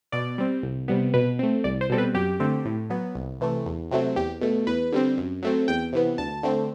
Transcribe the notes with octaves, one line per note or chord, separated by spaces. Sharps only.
B2 D5
G3 C4
C2
C3 G3 B3
B2 B4
A3 C4
C2 D5
C5
B2 G3 C4 A4
B4
F#2 G4
D3 A3 C4
A2
F#3 B3
C2
C3 E3 A3
E2
C3 F#3 A3 C4
E2 G4
B2 A3
E2 B4
D3 G3 C4
F#2
F#3 A3 C4
E2 G5
C3 E3 B3
D2 A5
D3 A3 C4